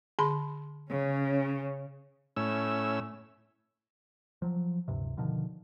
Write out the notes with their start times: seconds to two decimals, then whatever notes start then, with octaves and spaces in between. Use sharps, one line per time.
0.19 D3 B5 C6
0.91 C#3 C#4
2.37 A2 C#4 E6
4.42 F3 F#3
4.88 D1 G2 C3
5.17 B2 D3 D#3 F3